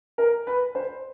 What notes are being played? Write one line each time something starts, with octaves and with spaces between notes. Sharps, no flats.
A#4
B4
C5